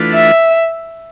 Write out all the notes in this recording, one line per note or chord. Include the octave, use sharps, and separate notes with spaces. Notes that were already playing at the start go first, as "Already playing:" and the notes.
Already playing: E3 A3 D4 F4 B4
E5